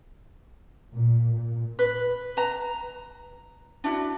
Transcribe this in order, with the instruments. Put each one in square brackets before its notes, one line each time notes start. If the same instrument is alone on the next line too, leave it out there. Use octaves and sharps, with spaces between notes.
[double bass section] A#2
A#2
[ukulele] B4
B4 A#5
D4 E4 F#4